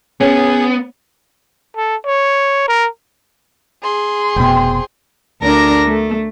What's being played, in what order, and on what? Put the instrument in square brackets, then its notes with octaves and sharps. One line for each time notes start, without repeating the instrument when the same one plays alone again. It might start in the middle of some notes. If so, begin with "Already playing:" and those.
[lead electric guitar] B3 [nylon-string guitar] C#4 [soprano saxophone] G#4
[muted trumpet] A4
C#5
A#4
[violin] G#4 C6
[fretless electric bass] F1 B2 [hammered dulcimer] C5 G5
[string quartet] D2 D4 A#4 A#6
A3